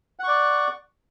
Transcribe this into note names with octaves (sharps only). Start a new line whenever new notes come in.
D5 F#5 C#6